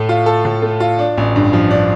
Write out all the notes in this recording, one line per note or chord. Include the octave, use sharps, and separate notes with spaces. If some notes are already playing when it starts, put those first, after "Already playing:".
Already playing: A2 A3
F4
A4
A2
A3
F4
D4
A1
G2
F3
D4